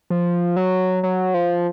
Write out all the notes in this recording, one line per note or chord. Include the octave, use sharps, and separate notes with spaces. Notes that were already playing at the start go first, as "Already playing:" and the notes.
F3
F#3
F#3
F3